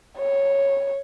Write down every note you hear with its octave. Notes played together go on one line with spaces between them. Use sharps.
C#5